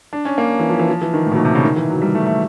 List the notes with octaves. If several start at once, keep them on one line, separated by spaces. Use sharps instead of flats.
D4
C#4
A#3
E3
F3
E3
F3
E3
D#3
A2
B2
A#2
C3
C#3
D#3
E3
F#3
G3
A3
A3